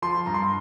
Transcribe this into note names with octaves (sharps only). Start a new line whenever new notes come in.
F3 C6
G2 A#5
C6